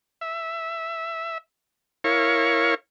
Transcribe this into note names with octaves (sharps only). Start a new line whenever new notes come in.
E5
E4 A#4 C#5 F5 C#6